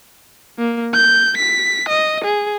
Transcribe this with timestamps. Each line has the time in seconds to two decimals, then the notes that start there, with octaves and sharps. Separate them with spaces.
0.59 A#3
0.94 G6
1.38 B6
1.89 D#5
2.24 G#4